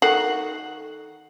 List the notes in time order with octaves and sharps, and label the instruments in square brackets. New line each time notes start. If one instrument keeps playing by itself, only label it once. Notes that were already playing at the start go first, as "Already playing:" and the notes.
[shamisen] D#3 F#4 [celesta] A4 C7 F#7